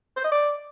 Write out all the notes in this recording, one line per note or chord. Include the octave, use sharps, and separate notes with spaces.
C5
D#5
D5